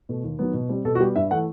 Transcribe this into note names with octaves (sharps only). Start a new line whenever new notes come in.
B2 A3
D#2
D#3 F#3 B3
B2
G3 C4
B2 A4
F#4
G3 B3 G4
G2 E5
E3 A3 F#5